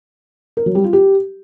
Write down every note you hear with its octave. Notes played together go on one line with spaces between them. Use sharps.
A#4
F#3
G3
F4
G4